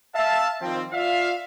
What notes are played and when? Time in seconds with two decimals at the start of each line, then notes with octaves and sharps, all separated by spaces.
0.14 E5 F5 A5
0.60 D#3 F3 G3 C4
0.92 F4 D5 E5 F5